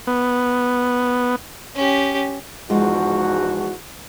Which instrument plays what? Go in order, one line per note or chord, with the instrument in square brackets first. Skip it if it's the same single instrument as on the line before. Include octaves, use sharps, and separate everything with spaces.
[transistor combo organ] B3
[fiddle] C#4 G4
[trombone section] E2 G#2 F#4 [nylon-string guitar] F3 G#3 F4